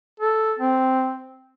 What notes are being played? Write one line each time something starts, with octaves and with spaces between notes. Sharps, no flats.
A4
C4